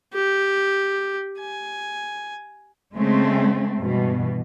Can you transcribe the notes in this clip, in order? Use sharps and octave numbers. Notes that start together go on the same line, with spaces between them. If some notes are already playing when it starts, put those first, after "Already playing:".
G4
G#5
C#3 G#3 A3 C4
G2 B2 E3